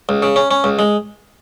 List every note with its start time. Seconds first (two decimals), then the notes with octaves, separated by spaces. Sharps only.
0.09 C#2
0.22 C#3
0.36 C#4
0.51 C#4
0.64 C#2
0.79 G#3